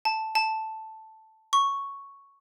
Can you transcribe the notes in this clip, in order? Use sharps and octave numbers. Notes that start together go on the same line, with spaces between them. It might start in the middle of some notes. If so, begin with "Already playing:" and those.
A5
A5
C#6